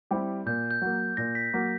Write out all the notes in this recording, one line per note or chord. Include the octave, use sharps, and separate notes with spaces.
G3 C4 E4 G4
A#2 G6
G6
F#3 A#3
A#2 A#6
B6
F#3 A#3